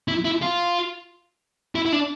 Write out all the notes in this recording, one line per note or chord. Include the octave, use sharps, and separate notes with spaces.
E4
E4
F4
E4
E4
D4